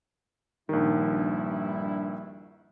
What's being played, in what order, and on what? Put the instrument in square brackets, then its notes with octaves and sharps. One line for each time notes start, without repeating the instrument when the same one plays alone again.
[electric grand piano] A#1 D#3 [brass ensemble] G2 E4